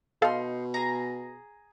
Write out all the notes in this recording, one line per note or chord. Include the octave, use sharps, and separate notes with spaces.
B2 D#4 A4 F5 A5 C6
G#4 A#5